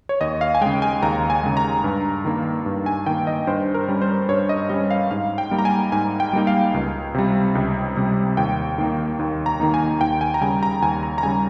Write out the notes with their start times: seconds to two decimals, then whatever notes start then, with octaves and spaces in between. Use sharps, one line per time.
0.09 C#5
0.21 D#2 D#5
0.41 F5
0.55 G#5
0.61 C#3 G#3 G5
0.82 G#5
1.03 D#2 A#5
1.30 G#5
1.43 C#3 G#3
1.57 A#5
1.84 G2
2.25 D#3 A#3
2.66 G2
2.86 G#5
3.06 D#3 A#3 G5
3.27 D#5
3.47 G2 C5
3.74 A#4
3.88 G3 C#4
4.02 C5
4.28 G2 C#5
4.49 D#5
4.69 G3 C#4 D#5
4.91 F5
5.11 G#2 F5
5.38 G5
5.51 G3 A#3 D#4
5.59 A#5
5.65 G#5
5.92 G#2 G#5
6.20 G5
6.33 G3 A#3 D#4
6.47 F5
6.74 C#2
7.15 C3 G3
7.55 C#2
7.96 C3 G3
8.37 D#2 G5
8.78 D#3 A#3 D#4
9.19 D#2
9.46 A#5
9.60 D#3 A#3 D#4
9.74 G#5
10.01 D#2 G5
10.21 G#5
10.34 A#5
10.41 C#3 G3 G#5
10.63 A#5
10.82 D#2 G#5
11.03 A#5
11.18 A#5
11.23 C#3 G3 G#5